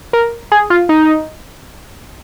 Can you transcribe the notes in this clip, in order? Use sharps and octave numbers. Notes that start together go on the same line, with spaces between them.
A#4
G#4
F4
D#4